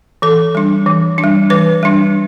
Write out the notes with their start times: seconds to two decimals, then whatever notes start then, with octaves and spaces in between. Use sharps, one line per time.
0.22 E3 A4
0.55 G3 D4
0.86 E3
1.18 D4
1.24 G3
1.50 E3 B4
1.83 G3 D4